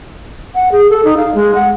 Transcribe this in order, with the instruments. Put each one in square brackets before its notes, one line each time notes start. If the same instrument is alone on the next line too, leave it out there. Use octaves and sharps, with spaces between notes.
[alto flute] F#5
G#4
A4
D#4
F5
G#3
F#5